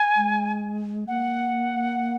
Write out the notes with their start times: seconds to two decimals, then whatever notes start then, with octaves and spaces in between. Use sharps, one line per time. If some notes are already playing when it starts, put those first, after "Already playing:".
Already playing: G#5
0.16 G#3
1.08 A#3 F#5